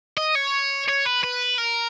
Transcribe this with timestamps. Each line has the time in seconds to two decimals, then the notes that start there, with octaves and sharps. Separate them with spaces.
0.17 D#5
0.35 C#5
0.88 C#5
1.05 B4
1.23 B4
1.58 A#4